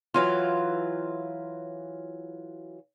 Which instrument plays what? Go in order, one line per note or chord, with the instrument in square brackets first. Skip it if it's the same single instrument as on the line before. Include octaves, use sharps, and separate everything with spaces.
[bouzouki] E3 F#3 F4